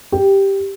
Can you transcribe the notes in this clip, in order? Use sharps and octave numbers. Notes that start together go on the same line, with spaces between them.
G4